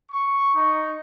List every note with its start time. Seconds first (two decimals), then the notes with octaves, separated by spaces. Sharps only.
0.11 C#6
0.54 D#4